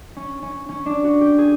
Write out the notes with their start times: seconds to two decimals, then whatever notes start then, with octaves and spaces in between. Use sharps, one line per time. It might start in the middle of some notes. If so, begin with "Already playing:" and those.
0.16 C#4
0.42 C#4
0.69 C#4
0.86 D4
1.04 F#4
1.21 G4
1.38 G#4